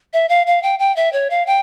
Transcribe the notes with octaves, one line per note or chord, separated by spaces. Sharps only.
E5
F5
F5
G5
G5
E5
C#5
F5
G5